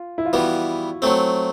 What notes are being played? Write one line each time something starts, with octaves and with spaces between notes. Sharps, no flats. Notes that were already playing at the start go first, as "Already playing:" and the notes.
Already playing: F4
E4
F4
E3 G3 B3 F#4
F#3 A3 C4